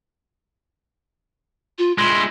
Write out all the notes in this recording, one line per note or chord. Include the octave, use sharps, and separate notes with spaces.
F4
G#3 E4 C6